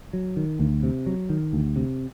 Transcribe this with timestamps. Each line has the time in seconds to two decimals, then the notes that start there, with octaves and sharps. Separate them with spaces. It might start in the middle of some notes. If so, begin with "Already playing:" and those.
0.13 F#3
0.37 D#3
0.59 D2
0.83 C3
1.06 F#3
1.30 D#3
1.53 D2
1.76 C3